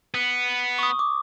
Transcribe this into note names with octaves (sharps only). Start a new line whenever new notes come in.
B3
C#6 D#6
D6